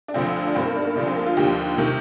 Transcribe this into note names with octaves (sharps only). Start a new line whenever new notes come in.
D4
D2 D3 F3 C4
D4
G1 G2 D#3 C4
A#3
D4
A#3
D2 D3 F3 D4
C4
A#3
F4
D#2 D3 F3 G4
C3 D#3